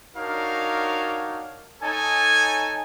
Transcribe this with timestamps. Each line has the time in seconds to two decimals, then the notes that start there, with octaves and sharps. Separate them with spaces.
0.16 D4 D#4 F#4 A#4 C#5 F5
1.82 D#4 A4 C#5 G#5